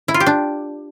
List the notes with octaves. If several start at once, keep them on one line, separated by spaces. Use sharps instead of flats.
E4
F4
G4
D4